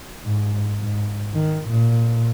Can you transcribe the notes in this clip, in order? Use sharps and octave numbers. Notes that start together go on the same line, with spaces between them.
G#2
G#2
D#3
A#2